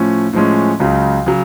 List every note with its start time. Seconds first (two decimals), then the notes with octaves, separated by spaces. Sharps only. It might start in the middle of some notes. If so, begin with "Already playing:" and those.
Already playing: A2 F3 C#4
0.33 A2 F3 G#3 C#4
0.80 C#2 C#3 F#3
1.26 C#3 F#3